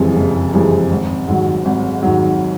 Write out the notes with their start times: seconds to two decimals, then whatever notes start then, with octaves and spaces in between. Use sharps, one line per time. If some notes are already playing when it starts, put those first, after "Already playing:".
Already playing: F#1 F2 C3 E3 G#3
0.16 F#1
0.54 F2 C3 E3 G#3
0.91 G#1
1.28 G#2 D#3 F#3
1.65 G#1
2.03 G#2 D#3 F#3